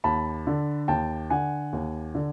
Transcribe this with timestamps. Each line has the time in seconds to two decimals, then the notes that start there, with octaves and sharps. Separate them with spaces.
0.04 D#2 A5 B5
0.47 D3
0.88 D#2 G5 A5
1.30 D3 F#5 G#5
1.73 D#2
2.15 D3